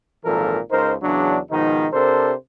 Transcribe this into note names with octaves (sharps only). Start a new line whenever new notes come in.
G#1 A#2 E3 F3 A4 A#4
C#2 D#4 A#4 C5
E2 C#3 F#3 D4
G#2 B2 D#3 F3 D#4
C3 D4 A4 A#4 C5